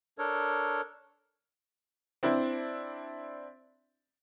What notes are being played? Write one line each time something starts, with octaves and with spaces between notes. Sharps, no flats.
D4 A4 A#4 C#5
C4 D4 E4